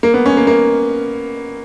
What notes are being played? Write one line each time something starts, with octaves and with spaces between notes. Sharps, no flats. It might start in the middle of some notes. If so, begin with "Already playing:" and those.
A#3
B3
C#4
A#3
A#3